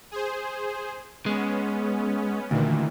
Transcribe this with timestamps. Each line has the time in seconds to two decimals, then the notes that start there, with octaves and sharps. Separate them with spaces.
0.11 G#4 C5
1.26 G#3 B3 C#4
2.51 D2 A#2 D#3 E3